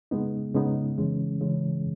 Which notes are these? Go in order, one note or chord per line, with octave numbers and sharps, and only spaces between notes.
C#3 G#3 B3 D#4
C#3 G#3 B3 D#4
C#3 E3 G#3 C#4
C#3 E3 G#3 C#4